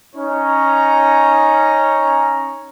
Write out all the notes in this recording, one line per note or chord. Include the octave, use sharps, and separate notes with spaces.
C#4 D#4 C#5 A#5